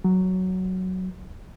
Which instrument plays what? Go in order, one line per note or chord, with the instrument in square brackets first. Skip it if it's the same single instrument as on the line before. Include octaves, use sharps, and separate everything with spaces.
[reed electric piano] F#3